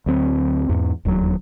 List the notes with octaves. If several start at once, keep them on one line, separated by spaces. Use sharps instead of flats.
D2 F#3 C4
E2 G#2
E1 D#2 D#3 F#3